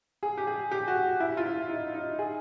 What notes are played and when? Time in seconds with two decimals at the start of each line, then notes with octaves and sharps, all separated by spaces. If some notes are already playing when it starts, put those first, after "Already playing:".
0.23 G#4
0.38 G4
0.47 G#4
0.71 G4
0.88 F#4
1.20 E4
1.37 F4
1.46 E4
1.69 D#4
1.94 D#4
2.19 G#4